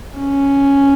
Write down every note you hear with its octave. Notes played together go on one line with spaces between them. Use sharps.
C#4